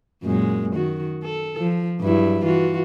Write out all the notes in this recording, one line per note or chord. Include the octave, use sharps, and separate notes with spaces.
F#2 A#2 G#3
D#3 F#4
A4
F3
G2 F#3 E4
E3 F4 F#4